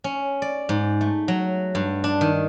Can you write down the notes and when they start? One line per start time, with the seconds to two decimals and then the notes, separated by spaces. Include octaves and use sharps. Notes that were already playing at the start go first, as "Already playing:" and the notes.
0.04 C#4
0.42 D5
0.69 G#2
1.01 A3
1.28 F#3
1.75 G2
2.04 D4
2.21 D#3